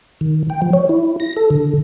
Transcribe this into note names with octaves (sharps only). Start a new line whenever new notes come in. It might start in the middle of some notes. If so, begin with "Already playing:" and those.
D#3
G5
F3
C#5
E4
A#6
A4
D3